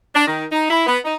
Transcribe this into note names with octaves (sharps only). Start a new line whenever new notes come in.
D4
D#3
D#4
E4
B3
D#4